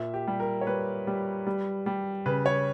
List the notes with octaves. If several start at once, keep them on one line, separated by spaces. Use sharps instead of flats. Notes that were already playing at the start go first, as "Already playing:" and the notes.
Already playing: A#2 E5
G4
G3
A#4
C#5
G3 B4
G3
G3
G3
C#3 B4
C#5